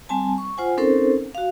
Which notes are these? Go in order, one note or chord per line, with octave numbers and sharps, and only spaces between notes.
G3 C4 G#5 A5
C#6
F4 C5 F#5 G#5
C4 C#4 D#4 A4 A#4 C5
F#4 F5